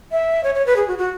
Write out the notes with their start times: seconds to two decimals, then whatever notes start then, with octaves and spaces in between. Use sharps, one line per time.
0.12 E5
0.44 C#5
0.55 C#5
0.66 B4
0.76 G#4
0.88 F#4
0.98 F#4